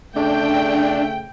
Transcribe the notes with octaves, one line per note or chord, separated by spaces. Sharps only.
C#3 A3 D4 G5